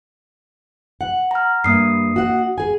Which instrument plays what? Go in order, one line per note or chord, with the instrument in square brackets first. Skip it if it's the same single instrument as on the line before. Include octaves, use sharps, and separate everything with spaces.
[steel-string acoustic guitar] F#5
[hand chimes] A#5 F6
[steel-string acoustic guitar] G2 [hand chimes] A#3 D#6 C7
[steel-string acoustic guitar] F#4 F#5
G#4 G#5